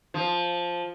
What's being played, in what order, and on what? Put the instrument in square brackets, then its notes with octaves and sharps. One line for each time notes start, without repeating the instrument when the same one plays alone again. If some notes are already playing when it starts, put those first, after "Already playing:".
[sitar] F3